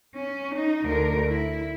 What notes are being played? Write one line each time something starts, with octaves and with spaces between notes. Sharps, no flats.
C#4
D#4
D2 A#4
E4